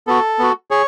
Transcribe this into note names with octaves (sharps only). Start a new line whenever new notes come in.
B3 F#4 A4
B3 F#4
G#4 C#5